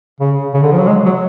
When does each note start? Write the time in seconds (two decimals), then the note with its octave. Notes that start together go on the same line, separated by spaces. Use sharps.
0.21 C#3
0.54 C#3
0.63 D3
0.72 F3
0.80 F#3
0.88 G#3
1.06 F#3